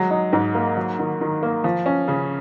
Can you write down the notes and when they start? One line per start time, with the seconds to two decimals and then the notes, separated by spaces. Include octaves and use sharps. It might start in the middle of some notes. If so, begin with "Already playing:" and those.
Already playing: F#3 G#3
0.11 D#4
0.33 G#2
0.55 A#3
0.77 F#3
0.99 D#3
1.21 D#3
1.43 A#3
1.64 F3
1.86 C#4
2.08 C#3